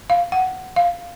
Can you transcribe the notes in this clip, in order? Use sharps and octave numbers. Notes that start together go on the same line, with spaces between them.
F5
F#5
F5